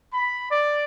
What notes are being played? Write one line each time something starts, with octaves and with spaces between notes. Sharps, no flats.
B5
D5